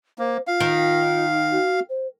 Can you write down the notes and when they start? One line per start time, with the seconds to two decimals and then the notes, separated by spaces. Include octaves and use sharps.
0.19 A#3 C5
0.47 F4 F5
0.60 D#3
1.52 F#4
1.89 C5